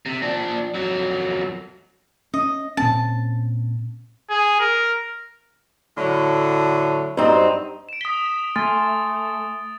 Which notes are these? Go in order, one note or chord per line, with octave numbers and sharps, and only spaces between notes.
C3
F3 D4
F2 F#3
C#4 D#5
A#2 C4 C#4 A5
G#4
A#4
A2 D3 F#3
G2 F#3 C4 D#4
D7 E7
D#6 B6 G7
A3 G#5 C6 F6 A6